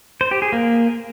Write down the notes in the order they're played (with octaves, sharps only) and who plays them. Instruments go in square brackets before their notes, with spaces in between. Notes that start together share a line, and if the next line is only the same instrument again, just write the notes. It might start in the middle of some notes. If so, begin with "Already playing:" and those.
[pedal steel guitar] C5
G4
G#4
A#3